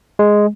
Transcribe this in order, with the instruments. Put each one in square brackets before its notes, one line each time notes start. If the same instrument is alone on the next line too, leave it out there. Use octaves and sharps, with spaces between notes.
[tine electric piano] G#3